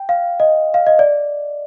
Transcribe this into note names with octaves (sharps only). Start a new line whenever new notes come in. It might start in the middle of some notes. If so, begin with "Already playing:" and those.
Already playing: G5
F5
D#5
F5
D#5
D5